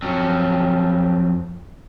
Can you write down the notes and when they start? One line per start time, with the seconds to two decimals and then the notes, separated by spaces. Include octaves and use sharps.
0.02 F2 F#3